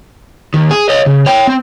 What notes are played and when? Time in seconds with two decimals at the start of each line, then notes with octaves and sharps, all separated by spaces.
0.54 D#2 D#3
0.71 G#4
0.89 C#5 D#5
1.06 C#3
1.26 C#5 G5
1.47 C4